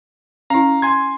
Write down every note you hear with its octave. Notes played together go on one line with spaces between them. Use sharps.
C#4 E4 F5 A#5
G#5 C6 G#6